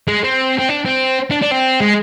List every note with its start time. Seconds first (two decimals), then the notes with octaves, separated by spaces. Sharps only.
0.08 G#3
0.24 C4
0.59 C4
0.69 D4
0.85 C4
1.30 D4
1.42 D4
1.51 C4
1.80 G#3